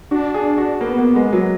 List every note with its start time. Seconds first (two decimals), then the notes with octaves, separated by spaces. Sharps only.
0.11 D4 F#4
0.34 G#4
0.58 F#4
0.81 A#3 B3
0.98 A#3
1.16 G#3
1.33 F#3